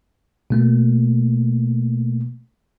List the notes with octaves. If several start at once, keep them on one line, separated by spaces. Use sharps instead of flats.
B2 A3 A#3